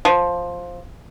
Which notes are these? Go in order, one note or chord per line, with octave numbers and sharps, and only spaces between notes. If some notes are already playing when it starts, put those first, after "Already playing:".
F3